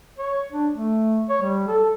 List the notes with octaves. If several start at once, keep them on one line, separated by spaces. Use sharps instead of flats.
C#5
D4
A3
C#5
G3
A4